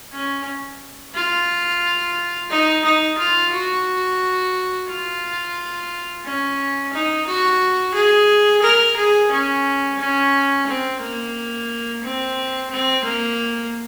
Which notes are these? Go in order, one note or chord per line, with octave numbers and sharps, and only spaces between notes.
C#4
F4
D#4
D#4
F4
F#4
F4
C#4
D#4
F#4
G#4
A#4
G#4
C#4
C#4
C4
A#3
C4
C4
A#3